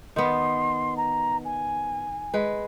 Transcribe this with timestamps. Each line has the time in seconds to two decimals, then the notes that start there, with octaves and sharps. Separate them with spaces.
0.16 D#3 B3 C6
0.96 A#5
1.44 G#5
2.34 G#3 B4